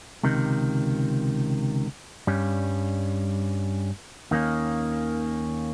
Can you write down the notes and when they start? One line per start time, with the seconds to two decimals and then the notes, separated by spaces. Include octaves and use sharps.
0.23 C#2 C3 D#3
2.27 G2 G3 C#4
4.31 D#2 D#3 A#3 C#4